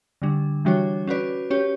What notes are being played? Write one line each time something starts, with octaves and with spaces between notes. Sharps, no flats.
D3 G3 D4
E3 G3 D4 F#4 C#5
C#4 F#4 B4 D5
C#4 G4 C#5